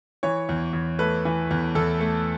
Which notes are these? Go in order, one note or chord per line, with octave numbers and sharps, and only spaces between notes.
E3 C#5
E2
E2
A3 B4
E3
E2
E2 A4
A3